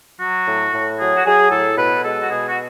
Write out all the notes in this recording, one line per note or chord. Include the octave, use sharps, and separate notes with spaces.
F#3 F#4
A2
A2
F#3 G#4
F#4
F#3 G#4
A2 A4
B2 B4
G#3 A4
F#4
B2 G#4
F#4